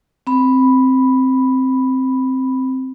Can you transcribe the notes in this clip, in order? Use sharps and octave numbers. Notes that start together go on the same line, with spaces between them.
C4 B5